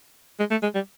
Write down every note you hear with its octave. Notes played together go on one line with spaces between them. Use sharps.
G#3
A3
G#3
G3